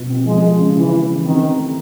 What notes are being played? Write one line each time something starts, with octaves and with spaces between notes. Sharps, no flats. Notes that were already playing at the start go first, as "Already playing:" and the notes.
Already playing: B2 F4
C4
F3 G#3
G#3
C#3
E3 E4
E4
E3
D#3 C4
C4
A3